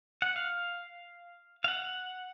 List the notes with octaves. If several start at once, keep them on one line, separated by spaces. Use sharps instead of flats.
F#5
F5
F5
F#5